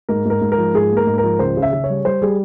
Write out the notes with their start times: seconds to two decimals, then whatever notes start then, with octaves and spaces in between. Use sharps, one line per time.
0.09 G#2 A#4
0.25 G#2 A#4
0.41 G#2
0.52 A#4
0.58 F3
0.74 G#2 G#4
0.91 A#3
0.97 A#4
1.07 G#2
1.18 F3 A#4
1.39 C#2 C5
1.57 C#3
1.62 E5
1.73 C#3
1.84 C#5
1.90 G3
2.05 G3 C5
2.22 G3 G#4